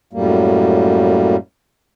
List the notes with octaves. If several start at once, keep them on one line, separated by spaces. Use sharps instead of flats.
F#2 A2 G3 A#3